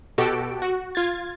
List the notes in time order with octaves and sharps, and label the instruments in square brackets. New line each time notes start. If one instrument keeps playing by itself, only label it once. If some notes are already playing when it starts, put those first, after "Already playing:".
[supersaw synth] B2 F#4 G4 A4 D7
F#4
F4 G#6 A6